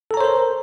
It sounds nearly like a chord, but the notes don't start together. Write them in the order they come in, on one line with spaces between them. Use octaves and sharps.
A4 A#5 C#5 C5 A#4